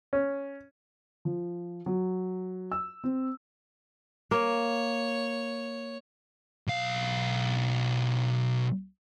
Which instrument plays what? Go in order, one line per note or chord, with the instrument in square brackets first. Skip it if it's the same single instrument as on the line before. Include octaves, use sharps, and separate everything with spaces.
[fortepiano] C#4
[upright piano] F3
F#3
E6
C4
[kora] A#3 [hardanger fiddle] C#5
[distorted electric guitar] B1 F5